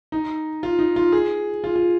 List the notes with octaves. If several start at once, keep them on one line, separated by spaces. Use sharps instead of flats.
D#4
F4
D#4
F4
G#4
F4
F4